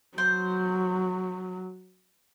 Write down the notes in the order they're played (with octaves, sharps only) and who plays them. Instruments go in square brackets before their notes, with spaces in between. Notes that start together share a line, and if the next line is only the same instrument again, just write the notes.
[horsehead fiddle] F#3 [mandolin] C5